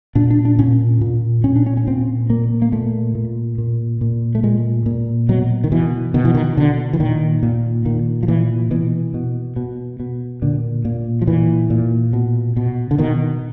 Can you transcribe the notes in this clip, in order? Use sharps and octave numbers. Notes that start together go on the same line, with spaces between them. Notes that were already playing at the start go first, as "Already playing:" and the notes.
A#2 D4
D4
D4
A#2 C#4
A#2
A#2 C#4
D4
C#4
C#4
A#2 C4
A#2 A#3
A#3
A#2 A3
A#2
A#2
A#2
A3
A#2 G#3
A#2
B2 F#3
D#3
B2 E3
B2 D#3
E3
D#3
B2 D3
E3
A#2 D#3
A#2
A#2 D#3
F3
A#2 E3
B2 E3
B2
B2
B2
A#2 D3
A#2
F3
A#2 E3
A#2
B2
B2
D3
B2 D#3